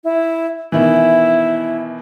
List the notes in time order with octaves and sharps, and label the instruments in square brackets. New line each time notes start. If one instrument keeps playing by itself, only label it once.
[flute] E4
[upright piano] B2 D#3 E3 [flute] E4